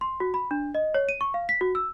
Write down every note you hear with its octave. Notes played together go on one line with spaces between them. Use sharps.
C6
F#4
B5
D4
D#5
C#5
D#7
C#6
F5
B6
F#4
E6